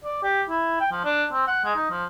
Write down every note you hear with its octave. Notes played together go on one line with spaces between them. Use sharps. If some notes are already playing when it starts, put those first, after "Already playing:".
D5
G4
E4
G5
F3
D4
C4
F#5
G#3
D#4
F3